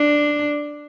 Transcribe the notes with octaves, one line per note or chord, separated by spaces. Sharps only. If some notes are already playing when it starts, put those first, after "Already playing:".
Already playing: D4